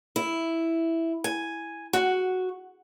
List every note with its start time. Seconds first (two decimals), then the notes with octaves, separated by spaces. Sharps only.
0.16 E4
1.24 G#5
1.93 F#4